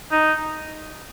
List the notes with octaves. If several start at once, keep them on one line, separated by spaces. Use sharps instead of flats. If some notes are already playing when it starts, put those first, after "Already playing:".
D#4